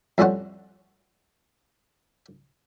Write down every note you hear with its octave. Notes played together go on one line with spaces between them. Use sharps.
F2 A2 G3 C#4 C5 F#5